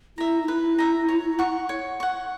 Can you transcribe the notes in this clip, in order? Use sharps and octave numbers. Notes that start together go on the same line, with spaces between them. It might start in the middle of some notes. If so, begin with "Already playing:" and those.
E4 E5 A#5
D#4
E4 B4
E5 A#5
C#5
F#5 C#6
C#5
F#5 C#6